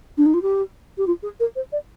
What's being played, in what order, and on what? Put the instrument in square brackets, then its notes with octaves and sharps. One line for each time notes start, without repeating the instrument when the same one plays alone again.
[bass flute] D4
D#4
F4
G4
G4
F4
G#4
A#4
C5
D5